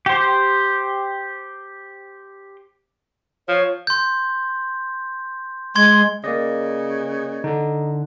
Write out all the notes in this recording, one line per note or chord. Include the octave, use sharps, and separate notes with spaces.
G4 C5
F3 C#5
C6 G6
G#3 C6 G#6 G7
C#3 A#3 D5 D#5
D3 D#4